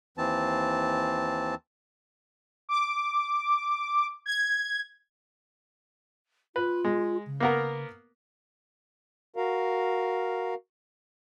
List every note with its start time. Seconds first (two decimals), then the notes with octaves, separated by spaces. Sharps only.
0.18 D#2 E3 C4 A5
2.69 D6
4.26 G#6
6.56 F4 B4
6.85 G#3
7.26 C#3
7.40 A#3 B3 A#4
9.36 F#4 A#4 F5